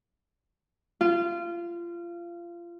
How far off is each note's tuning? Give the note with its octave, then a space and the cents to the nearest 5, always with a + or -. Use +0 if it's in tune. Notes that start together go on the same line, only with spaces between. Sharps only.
F4 -25